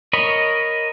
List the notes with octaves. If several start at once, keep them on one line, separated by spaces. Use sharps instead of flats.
A#4 C#5 D#5 B5